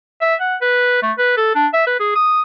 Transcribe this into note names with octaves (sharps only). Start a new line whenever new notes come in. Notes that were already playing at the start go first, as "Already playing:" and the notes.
E5
F#5
B4
A3
B4
A4
D4
E5
B4
G#4
D#6